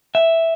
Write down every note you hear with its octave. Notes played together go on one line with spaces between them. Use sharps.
E5